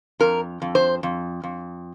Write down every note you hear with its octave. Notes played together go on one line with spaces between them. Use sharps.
F2 A#4
F2
C5
F2
F2